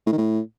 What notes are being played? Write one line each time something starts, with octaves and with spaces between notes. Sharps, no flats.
A2
D#3
A2